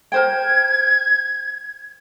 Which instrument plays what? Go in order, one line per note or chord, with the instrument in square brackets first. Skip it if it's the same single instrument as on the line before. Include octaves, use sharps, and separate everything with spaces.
[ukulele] A#4 C5 G5 [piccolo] G#6